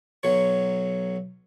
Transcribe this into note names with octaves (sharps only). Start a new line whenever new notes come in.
B1 F#3 C#5